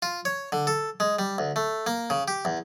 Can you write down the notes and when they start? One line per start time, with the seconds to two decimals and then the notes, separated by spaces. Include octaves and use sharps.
0.02 F4
0.25 C#5
0.52 D3
0.67 A4
1.00 G#3
1.19 G3
1.38 D2
1.56 A3
1.87 A#3
2.10 C#3
2.28 G4
2.45 E2